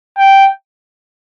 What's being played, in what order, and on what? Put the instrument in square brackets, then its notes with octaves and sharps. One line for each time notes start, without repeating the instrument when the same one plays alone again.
[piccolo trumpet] G5